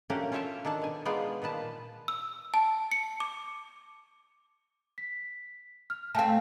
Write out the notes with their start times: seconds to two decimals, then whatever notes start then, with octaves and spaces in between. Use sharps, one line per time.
0.10 A3 A#3 C#4 D4 F#4 G4
0.32 C#4 F4 C#5 E5 G5 A5
0.65 D#3 D4 A4 A5
0.82 B2 G#5
1.05 G#3 B3 D#4 F4 G#4 D5
1.42 A#2 D#3 B4 A5
2.08 E6
2.54 A5
2.91 C#7
3.20 D6
4.98 B6
5.90 F6
6.15 A3 C4 F5 G#5 A5